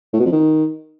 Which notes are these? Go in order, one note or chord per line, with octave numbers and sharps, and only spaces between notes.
A2
B2
F2
D#3